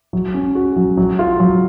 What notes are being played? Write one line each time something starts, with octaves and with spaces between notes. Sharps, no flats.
F#3
C#4
F#4
F#3
F#3
F4
F#3